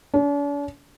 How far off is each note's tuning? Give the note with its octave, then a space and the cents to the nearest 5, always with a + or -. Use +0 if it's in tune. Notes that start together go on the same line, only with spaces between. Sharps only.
D4 -45